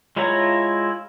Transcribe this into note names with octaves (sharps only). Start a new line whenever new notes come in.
G#3 E4 F4 C#5 A#5